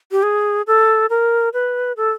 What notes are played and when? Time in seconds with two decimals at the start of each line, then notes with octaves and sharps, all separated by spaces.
0.12 G4
0.23 G#4
0.67 A4
1.10 A#4
1.53 B4
1.97 A4